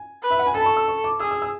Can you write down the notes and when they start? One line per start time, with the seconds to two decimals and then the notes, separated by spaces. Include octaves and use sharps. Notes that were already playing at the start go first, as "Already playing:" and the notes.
Already playing: G#5
0.23 B4
0.31 E5
0.39 F#5
0.47 G#5
0.55 A4 A5
0.61 B5
0.66 C#6
0.77 E6
0.88 C#6
1.04 D6
1.20 G#4 E6
1.31 E6
1.42 E6